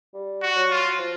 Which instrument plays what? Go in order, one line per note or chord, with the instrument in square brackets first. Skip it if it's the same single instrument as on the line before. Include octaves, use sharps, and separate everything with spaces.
[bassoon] G3
[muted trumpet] F#4
[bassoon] F#3
[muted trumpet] F4
[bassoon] F3